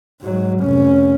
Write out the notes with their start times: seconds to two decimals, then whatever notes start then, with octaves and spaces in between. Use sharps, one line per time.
0.21 G#2 F#3
0.61 F1 C#4